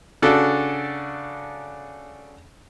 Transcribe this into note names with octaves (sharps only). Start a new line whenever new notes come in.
C#3 D4 F#4 A4